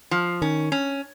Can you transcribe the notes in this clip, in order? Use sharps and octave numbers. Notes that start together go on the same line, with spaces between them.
F3
D#3 C#4
C#4